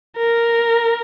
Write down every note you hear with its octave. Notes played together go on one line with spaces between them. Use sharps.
A#4